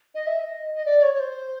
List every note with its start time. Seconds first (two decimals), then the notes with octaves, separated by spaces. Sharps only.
0.15 D#5
0.26 E5
0.40 D#5
0.75 D#5
0.85 D5
1.03 C#5
1.14 C#5
1.20 C5